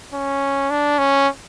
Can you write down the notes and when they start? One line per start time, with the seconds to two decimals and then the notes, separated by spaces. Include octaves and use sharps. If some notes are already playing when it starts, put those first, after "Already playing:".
0.14 C#4
0.70 D4
0.98 C#4